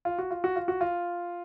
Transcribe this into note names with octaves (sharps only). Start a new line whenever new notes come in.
F4
F#4
F4
F#4
F4
F#4
F4